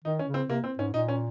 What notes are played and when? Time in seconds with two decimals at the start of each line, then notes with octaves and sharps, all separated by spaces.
0.05 D#3 D#4
0.19 C#4
0.27 C#3
0.34 C4
0.49 C3 A#3
0.64 C4
0.79 G#2 C#4
0.94 A#2 D#4
1.08 C#4